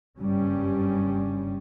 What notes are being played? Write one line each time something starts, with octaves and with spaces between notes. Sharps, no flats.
F#1 G2 G3 C#4